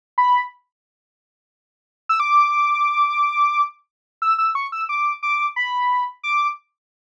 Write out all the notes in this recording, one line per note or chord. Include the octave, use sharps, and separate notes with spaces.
B5
E6
D6
E6
E6
C#6
E6
D6
D6
B5
D6